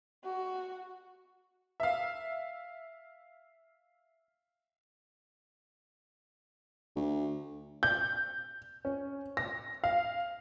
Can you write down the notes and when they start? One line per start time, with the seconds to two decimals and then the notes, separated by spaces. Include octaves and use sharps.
0.24 F#4
1.80 E5 F5
6.96 D2
7.83 G6
8.85 C#4
9.37 A#6
9.84 F5